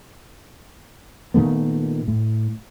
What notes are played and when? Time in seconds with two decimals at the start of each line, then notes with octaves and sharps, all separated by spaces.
1.34 A#2 D#3 A3 B3
2.08 A2